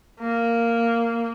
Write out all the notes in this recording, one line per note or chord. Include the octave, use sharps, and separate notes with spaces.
A#3